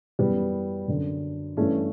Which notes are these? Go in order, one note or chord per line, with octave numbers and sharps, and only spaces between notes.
F#2 E3 G3 B3
F#2 D3
G2 E3 A3 C#4